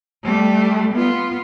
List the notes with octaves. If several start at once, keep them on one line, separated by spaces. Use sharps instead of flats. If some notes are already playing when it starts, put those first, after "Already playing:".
G3 A3
B3 F4